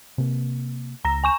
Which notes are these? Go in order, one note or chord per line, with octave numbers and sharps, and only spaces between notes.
C3 A#3
C#2 A#5 A#6
G#5 C#6 E7